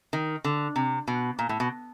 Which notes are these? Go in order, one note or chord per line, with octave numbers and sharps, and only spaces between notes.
D#3
D3
C3
B2
A#2
A2
B2